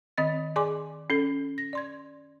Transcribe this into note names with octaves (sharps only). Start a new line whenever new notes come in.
D#3 C4 D#5 A6
G#4 D5 G#5 C6 D6
C#4 A4
A#6
D5 C6 G#6